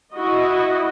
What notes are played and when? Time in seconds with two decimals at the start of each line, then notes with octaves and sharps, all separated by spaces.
0.13 E4 F#4 D#5